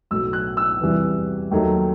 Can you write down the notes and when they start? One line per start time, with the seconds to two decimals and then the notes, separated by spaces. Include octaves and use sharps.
0.11 B1 A2 F#3 A3 E6
0.33 F#6
0.57 E6
0.80 E2 C3 E3 G3
1.51 D#2 D#3 F#3 A3